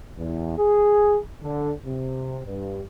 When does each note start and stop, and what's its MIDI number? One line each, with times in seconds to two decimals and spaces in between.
0.18 0.56 40
0.58 1.18 68
1.42 1.72 50
1.86 2.39 48
2.46 2.82 43